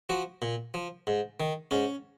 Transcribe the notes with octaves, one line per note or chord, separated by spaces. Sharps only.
F3 F#4
A#2
F3
G#2
D#3
G#2 C#4